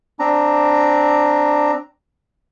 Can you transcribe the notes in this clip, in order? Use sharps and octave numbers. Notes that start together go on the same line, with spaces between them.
C4 D4 A#5